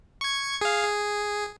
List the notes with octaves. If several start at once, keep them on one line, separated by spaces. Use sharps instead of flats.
C#6 G#6
G#4 F5
G#4